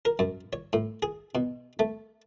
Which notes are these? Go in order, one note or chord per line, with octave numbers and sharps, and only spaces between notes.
A#4
F#2
C#5
A2
G#4
B2
A3